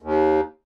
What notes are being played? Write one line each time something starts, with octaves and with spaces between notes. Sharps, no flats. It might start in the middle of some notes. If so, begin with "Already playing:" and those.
D#2